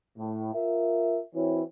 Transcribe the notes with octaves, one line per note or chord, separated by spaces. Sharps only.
A2
F4 A#4 E5
E3 C4 E4 F#4 C#5